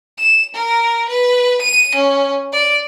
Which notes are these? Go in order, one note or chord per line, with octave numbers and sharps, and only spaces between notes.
E7
A#4
B4
D#7
C#4
D5